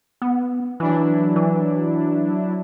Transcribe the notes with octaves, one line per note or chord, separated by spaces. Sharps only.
B3
E3 F#3 D4 E4
E3